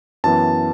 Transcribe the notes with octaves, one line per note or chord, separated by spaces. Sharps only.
F#2 E3 B3 A5